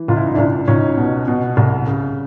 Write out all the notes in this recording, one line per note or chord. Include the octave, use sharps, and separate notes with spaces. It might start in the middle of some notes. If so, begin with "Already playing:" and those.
Already playing: E3
C#2 F4
E4
D#4
C#2 D4 E4
C#2 C#4 D#4
B2
B2
C2
C#3